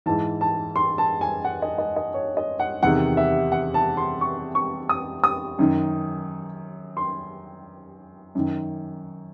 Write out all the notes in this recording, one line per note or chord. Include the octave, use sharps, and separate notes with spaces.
G#2 E3 A5
A5
C6
A5
G#5
F#5
D#5
D#5
D#5
C#5
D#5
F#5
E2 C3 D#3 F#5
E5
F#5
A5
C6
C#6
C#6
D#6
D#6
F#2 D#3
C6
F#2 D#3